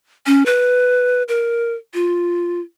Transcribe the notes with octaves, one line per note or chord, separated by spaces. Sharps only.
C#4
B4
A#4
F4